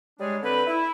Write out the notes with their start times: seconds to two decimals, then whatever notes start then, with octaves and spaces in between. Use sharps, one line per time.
0.19 G3 G#3 D4 G#4 C#5
0.42 D3 C4 G4 B4
0.67 E4